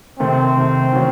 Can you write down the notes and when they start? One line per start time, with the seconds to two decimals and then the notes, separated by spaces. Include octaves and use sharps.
0.19 C3 D#3 A3 C4
0.57 C3 D#3 A3
0.93 D#3 F#3 C#4 F#4